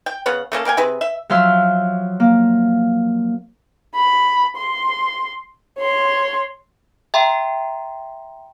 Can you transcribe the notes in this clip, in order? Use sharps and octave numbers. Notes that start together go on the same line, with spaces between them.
G5
C#3 B3 C#5 F#5
A3 A#3 C#4 A4
A#3 A#4 G5 G#5
C3 C4 G#4 B4
E5
F3 F#3 E5 C6 E6 F6
A#3
B5
C6
C#5 C6
E5 G5 A#5 C6